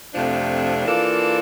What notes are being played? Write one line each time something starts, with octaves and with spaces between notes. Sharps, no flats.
F2 C3 F3 A3 D4
E3 A#3 D4 F4 A4